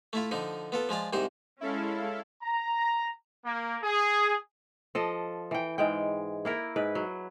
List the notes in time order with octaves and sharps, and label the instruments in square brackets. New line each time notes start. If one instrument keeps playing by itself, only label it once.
[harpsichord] A3 E4 F4
D3 F3 D#4
B3 F4 A4
F3 G#3 F4 D5
C2 G#2 C3 D#4 C5 C6
[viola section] G#3 C#4 [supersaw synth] E4 A4 F5
[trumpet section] A#5
A#3
G#4
[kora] F3 A4 D#5
E3 G5
G#2 G#3 G5
A#3 E4 A#4
G#2 B4
F#3